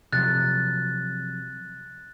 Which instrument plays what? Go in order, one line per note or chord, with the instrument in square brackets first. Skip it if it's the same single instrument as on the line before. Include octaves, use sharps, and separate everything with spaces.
[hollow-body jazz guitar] C3 F3 F#3 [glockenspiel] F#6 A6